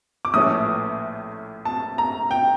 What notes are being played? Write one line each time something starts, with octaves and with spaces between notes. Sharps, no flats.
D6
A#1 A2 E3 A3 C#4 D#6
A5
A#5
G5